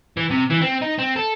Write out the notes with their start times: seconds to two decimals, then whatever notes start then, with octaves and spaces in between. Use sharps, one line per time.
0.17 E3
0.31 C3
0.50 E3
0.61 C4
0.82 D#4
0.98 C4
1.16 A4